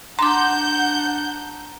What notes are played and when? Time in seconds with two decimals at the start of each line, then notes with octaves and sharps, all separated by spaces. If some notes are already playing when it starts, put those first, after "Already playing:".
0.19 D4 F#5 A#5 C6 D6 G6